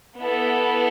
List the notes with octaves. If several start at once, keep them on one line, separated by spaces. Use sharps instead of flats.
B3 E4 A4